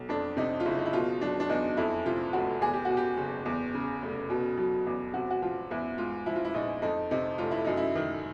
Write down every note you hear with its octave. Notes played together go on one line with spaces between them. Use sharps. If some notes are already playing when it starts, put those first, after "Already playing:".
Already playing: B1
F2 D4
C3 D#4
F4
F#1 E4
D#4
E4
B2 F4
F#3 D4
D4
E2 D#4
F2 E4
C3 F4
F1 F#4
E2 G#4
G4
B2 F#4
G4
F#1
E2
C#3
F1
B2
F#3
E2
C3 F#4
F#4
F3 F4
E2 E4
G#2 F4
F3 E4
F4
E4
A#1 D#4
F2 D#4
C3 D#4
F1 F4
E4
F#2 D#4
E4
D#3